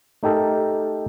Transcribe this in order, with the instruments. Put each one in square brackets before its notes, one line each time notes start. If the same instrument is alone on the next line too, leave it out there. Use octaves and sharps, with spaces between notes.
[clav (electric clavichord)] A3 D#4 G4 A4 A#4